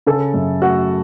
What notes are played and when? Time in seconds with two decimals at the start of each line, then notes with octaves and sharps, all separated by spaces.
0.07 C#3 A4
0.34 F#2
0.62 A3 F#4